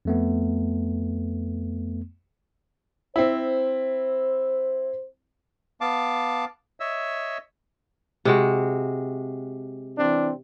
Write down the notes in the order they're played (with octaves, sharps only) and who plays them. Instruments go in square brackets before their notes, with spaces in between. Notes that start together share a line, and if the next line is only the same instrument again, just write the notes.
[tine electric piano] F2 A3 B3
[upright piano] C4 E4 [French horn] C5
[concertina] B3 F5 A5 D6
C#5 D#5 E5 E6
[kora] C3 G#3 F#4
[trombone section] E3 C4 D4